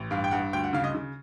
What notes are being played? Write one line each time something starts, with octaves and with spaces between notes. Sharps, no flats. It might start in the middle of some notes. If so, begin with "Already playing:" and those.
Already playing: A1
G2 F5
G5
G2 F#5
D2 G5
F#5
C#3 F5
D#5
C#3